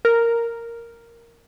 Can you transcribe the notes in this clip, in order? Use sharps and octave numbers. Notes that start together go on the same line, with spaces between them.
A#4